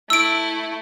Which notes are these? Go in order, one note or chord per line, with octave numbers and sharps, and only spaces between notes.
A3 E4 E6 D7